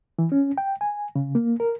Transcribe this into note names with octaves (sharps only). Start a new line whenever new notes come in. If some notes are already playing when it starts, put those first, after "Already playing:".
E3
C#4
G5
G#5
C#3
A#3
A#4